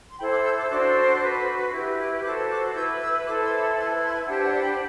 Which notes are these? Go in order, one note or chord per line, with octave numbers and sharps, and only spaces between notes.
C6
E4 A4 C5 G5 B5
D6 F#6
E6 G6
D6 F#6
D4 F#4 A4 C5 D6 F#6
D6 F#6
F#4 B4
E4 G4 B4
F#4 A4 C5 D6 F#6
D6 F#6
E4 B4 E6 G6
E6 G6
E4 A4 C5 D6 F#6
C6 E6
B5 D6
E4 B4 A5 C6
A5 C6
D4 G4 C5 F#5 A5
D5 F#5
G5 B5